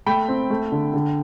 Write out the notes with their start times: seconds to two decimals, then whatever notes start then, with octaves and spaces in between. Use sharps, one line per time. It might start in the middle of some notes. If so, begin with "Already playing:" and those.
0.06 A3 G5 B5
0.28 C4
0.50 A3
0.72 D3
0.94 D3